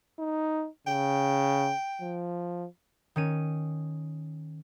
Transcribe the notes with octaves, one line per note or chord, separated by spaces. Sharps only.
D#4
C#3 G5
F3
D#3 C#4 D#7